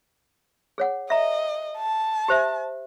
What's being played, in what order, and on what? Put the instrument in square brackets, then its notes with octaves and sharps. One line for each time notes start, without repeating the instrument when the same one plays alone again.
[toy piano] G#4 C#5 F#5
[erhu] D#5 [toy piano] E5 A#5
[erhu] A5
[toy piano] G4 C5 E5